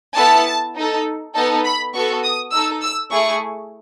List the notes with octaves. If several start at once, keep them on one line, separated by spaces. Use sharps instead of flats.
B3 E4 A4 A5
D#4 A4
B3 D#4 A4 A5
B5
B3 F#4 A4 C#6
D#6
D#4 A4 E6
E6
A3 E4 G#4 C#6